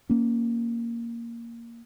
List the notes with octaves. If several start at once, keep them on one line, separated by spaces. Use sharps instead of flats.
A#3 C#4